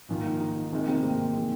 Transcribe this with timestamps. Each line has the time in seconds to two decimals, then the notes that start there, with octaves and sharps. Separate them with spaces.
0.09 A#1 G#2 D#3 A#3 F4
0.40 D#4
0.72 C3 D#3 G#3 D#4
0.88 C4
1.03 A#3
1.35 D#3 G#3